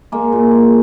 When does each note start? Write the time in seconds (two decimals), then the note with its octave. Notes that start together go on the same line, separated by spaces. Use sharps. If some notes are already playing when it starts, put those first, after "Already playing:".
0.12 G#3 A#3
0.33 A#2
0.51 G#3